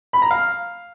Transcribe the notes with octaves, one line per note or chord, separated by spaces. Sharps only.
B5
A#5
F5